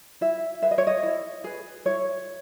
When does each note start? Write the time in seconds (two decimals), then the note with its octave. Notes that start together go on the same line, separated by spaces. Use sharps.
0.21 E4 E5
0.62 G#4 B4 E5
0.71 D#5
0.78 C#5
0.87 D#5
1.03 E4
1.44 G#4 B4
1.85 E4 C#5